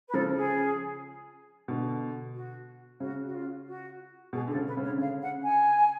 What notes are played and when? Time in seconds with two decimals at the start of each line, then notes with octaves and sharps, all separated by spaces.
0.08 B4
0.14 C#3 F3 A4
0.36 G#4
1.68 B2 D3
2.34 F#4
3.00 C#3 F#4
3.27 F#4
3.34 F4
3.67 F#4
4.33 B2 G#4
4.47 D3 A4
4.55 C#3
4.67 B4
4.77 C#3
4.83 C#5
4.88 D3
4.98 C#3 F5
5.22 F#5
5.43 G#5